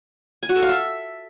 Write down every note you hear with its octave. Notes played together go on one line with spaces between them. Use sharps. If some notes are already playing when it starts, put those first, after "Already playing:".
G#5
F#4
A4
F5
E5